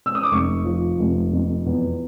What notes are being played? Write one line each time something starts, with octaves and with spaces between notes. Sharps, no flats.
E6
D#6
D6
F1 C#6
F3
F1
F2
E2